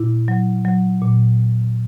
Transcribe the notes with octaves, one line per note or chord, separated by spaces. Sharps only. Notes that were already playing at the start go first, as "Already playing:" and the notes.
Already playing: A#2 E4
F#3
F#3
A#2